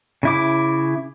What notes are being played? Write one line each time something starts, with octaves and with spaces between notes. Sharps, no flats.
C#3 E4 D6